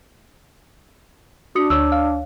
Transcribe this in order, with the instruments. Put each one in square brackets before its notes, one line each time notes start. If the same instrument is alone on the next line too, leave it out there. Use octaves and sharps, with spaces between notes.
[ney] D4 [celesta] F#4 D#6 C#7
[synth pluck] D2 C#5 [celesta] E6
[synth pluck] F5